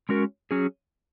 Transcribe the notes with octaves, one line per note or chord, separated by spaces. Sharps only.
G#3 C#4 F#4 A#4
F#3 C#4 G#4